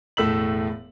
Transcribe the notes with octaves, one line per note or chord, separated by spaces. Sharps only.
E1 A2 A3 E6 B6 F#7